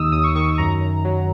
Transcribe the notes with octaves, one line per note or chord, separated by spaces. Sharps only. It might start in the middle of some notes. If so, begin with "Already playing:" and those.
Already playing: D#2 D#3 D#6 E6
D#2 D#6
C#6
D#3 C#6
F#2 A#5
F#2
F#3